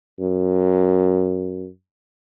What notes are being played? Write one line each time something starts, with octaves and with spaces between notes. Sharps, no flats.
F#2